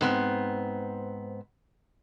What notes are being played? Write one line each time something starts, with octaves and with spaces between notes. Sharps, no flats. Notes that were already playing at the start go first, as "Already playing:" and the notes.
G#2 B3 C4